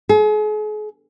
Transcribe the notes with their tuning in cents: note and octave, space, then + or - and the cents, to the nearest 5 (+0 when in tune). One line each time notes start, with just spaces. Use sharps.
G#4 +40